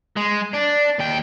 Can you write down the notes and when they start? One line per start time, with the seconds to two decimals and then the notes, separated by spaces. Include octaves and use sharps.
0.16 G#3
0.53 D4
0.99 D#2 G5